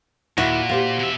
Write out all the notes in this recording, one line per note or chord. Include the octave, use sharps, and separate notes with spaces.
D#2 A#2 E4 F#4
G4 C5 F5
B2 E5